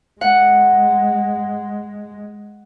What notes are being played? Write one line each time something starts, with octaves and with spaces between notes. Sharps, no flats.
G#3 F#5